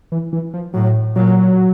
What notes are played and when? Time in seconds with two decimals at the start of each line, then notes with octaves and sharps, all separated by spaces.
0.12 E3
0.33 E3
0.54 F3
0.74 A2 F#3
1.16 A#2 F#3